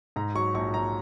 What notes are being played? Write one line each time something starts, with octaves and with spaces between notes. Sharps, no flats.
G#2 A#5
F#3 C#6
A#1 C#6
A#1 A#5